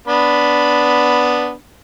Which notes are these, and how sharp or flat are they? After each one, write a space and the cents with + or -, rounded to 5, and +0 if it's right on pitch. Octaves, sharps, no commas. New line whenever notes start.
B3 +0 D4 -10 B5 +0